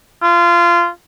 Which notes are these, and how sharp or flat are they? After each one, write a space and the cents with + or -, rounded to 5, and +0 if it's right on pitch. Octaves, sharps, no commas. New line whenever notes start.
F4 -20